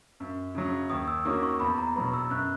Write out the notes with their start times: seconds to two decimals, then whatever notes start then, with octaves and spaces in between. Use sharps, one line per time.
0.20 F#2
0.55 C#3 F#3
0.90 D#2 D#6
1.08 E6
1.25 D#3 A#3 C#4 F#4 D#6
1.43 C#6
1.60 E2 B5
1.78 A#5
1.96 B2 F#3 B3 B5
2.14 E6
2.30 F#2 F#6